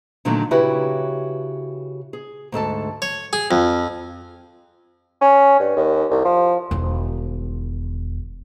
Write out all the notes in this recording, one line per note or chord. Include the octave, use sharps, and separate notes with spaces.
A#2 D3 D#3 F#3 A3 A#3
C#3 E4 F#4 G4 B4 C#5
G#4
D2 G#2 A4 A5
C#5
G#4
F2
C#4
G2
D#2
C2
F3
E1 D#3